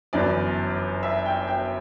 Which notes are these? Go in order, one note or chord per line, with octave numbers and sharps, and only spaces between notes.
G1 F#2 E3 D5
E5
G5
G5